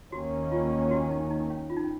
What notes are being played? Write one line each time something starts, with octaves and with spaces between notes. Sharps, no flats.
D#2 D#3 A#3 C#4 F#4
F4
F#4
D#4
D#4
C#4
F4
D#4
C#4